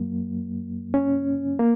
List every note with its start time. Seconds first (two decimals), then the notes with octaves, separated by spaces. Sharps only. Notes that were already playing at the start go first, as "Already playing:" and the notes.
Already playing: F#2 F#3 A#3
0.94 C#4
1.59 A#3